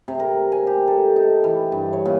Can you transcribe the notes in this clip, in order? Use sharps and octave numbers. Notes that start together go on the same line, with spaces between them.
C3
A#4
G#5
G4
A4
D#4
E3
G2
C#5
A#2